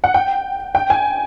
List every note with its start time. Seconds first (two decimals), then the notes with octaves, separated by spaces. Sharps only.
0.04 F#5
0.14 G5
0.75 G5
0.90 G#5